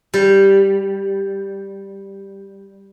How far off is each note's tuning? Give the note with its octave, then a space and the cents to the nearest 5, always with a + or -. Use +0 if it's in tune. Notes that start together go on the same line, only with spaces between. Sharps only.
G3 +0